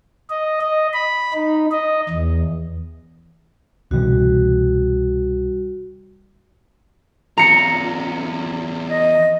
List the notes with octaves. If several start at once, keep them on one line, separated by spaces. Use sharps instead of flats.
D#5
D#5
B5
D#4
D#5
E2
C2 B2 E3 G3 F#4
E2 F4 A#5 C#7
D#5